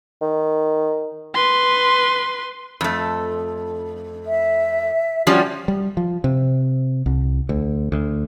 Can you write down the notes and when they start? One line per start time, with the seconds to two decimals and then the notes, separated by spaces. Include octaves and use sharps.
0.22 D#3
1.34 B4 C6
2.81 F2 A3
4.26 E5
5.27 F3 G3 C#4 F#4 G4 D5
5.68 G3
5.97 F3
6.24 C3
7.06 C2
7.49 D2
7.92 D2